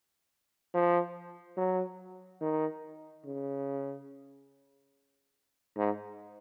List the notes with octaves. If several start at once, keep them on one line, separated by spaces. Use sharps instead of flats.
F3
F#3
D#3
C#3
G#2